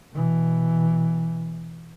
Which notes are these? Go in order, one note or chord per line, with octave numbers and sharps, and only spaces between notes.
B2 E3